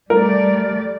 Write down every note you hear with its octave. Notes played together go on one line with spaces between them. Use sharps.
G3 A3 A#4 D5